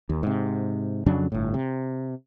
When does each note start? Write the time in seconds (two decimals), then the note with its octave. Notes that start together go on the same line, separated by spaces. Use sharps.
0.09 D#2
0.23 G#2 C3
1.06 F2 C#3 F#3 D4
1.32 G1 A2
1.54 C3